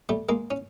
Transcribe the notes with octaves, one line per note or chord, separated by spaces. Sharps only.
G3 A3
G#3 A#3
C#4